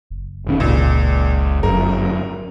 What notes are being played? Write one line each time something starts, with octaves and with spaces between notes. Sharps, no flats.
F#1
F1 D#3 C#4
C#2 A#2
G1 F#2 A#4